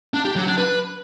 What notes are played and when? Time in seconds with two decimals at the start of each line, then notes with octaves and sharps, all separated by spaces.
0.14 D4
0.25 G4
0.36 F#3
0.47 D4
0.58 B4